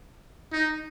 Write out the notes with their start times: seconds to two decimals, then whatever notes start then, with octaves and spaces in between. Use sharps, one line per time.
0.52 D#4